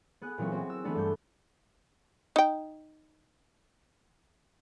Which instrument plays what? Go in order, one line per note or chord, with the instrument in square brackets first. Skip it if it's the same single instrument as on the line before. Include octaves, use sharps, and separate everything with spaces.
[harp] B3 G#4 F#6
A#2 E3 F#3 C4 C#4
C4 F#4
E6
E3 A3 B3 D4
G2 G6
[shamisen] D#4 G5